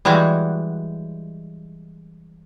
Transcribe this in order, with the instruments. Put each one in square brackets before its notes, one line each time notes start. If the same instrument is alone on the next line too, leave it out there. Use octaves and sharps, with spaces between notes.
[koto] E3 G3 G#3 F#4